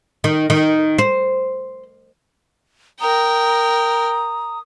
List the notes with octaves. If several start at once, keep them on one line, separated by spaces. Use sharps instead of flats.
D#3
D#3
C5
A#4 G5 A#5 D#6